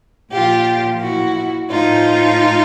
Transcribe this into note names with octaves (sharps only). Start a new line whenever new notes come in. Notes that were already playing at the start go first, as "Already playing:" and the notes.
A#2 F3 F4 G4
E4 F#4
A2 F3 D#4 F4